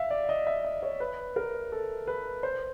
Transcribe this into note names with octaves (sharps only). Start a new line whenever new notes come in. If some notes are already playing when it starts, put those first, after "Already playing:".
Already playing: E5 F5
D5
D#5
E5
D#5
C#5
B4
A#4
A4
B4
C5